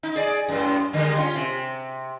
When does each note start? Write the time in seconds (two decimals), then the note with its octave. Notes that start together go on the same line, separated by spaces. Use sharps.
0.03 D#4
0.16 G#4 D5
0.48 F#2 A2
0.93 D3 G3 G#3
1.17 C#4 F4
1.35 C3